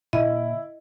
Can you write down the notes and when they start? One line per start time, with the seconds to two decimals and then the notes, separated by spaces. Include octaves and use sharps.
0.13 A#2 D3 A#3 E4 D#5